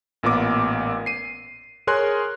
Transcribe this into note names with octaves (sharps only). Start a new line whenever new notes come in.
A1 A#2 B3 A#4 D6
C7 D#7
G#4 A#4 C#5 G#5 C6 F#6